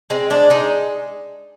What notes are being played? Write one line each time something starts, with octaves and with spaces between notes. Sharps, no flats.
G#3 C4
G#3 D4
G#3 D#4